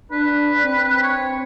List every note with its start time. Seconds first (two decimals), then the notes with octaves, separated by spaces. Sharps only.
0.12 D4 B4
0.64 C4
1.03 C#5